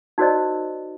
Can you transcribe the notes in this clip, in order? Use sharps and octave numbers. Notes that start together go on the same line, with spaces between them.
D#4 F#4 A#4 C5 D5 D#5